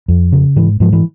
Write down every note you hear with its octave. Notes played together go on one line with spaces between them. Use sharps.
F2
C#3
G#2 E3
G#2 F3
E3